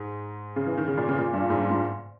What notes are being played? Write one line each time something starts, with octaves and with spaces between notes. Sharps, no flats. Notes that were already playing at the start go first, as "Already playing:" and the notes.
Already playing: G#2
C#3
E3
D#3
C#3
A#2
C#3
A#2
G2
G#2
G#2